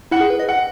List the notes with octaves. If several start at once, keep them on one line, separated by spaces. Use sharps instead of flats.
E4 F#5
G#4
B4
D#5
F#5